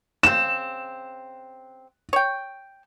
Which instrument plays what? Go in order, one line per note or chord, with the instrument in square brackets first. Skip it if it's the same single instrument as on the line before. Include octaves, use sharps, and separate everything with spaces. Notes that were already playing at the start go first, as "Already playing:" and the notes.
[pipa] C#3 C4 [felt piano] E7
[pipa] C#5 G5